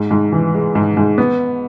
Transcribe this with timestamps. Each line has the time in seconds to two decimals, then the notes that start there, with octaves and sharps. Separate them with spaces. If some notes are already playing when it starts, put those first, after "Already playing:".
Already playing: G#2
0.11 G#2
0.32 E3
0.54 G#3
0.75 G#2
0.97 G#2
1.18 B3